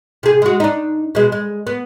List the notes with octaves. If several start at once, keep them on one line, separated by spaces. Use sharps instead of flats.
C3 G#4
G#3 F#4
D4 D#4
B2 G#3
G#3
B3